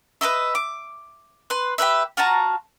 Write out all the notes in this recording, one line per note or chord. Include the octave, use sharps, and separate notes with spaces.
B4 C5 D#5 E5
D6
B4 C6
G4 G#4 B4 E5
F4 F#4 A5 A#5